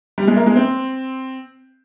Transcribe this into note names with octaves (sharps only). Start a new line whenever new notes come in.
G3
G#3
A#3
G#3
C4